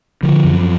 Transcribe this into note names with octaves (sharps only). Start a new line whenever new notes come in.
D3 F3
F#2